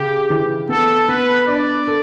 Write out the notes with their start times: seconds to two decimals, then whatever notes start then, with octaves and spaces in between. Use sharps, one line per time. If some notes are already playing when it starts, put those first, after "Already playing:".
Already playing: C#3 G4
0.30 E3
0.69 B3 A4
1.08 B3 B4
1.47 D4 D5
1.87 A4